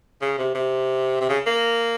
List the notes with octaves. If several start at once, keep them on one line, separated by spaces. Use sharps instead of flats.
C#3
C3
C3
C3
C#3
A#3